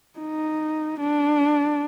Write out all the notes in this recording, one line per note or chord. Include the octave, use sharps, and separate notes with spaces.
D#4
D4